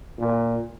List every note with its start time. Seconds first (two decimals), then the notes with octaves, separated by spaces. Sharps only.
0.19 A#2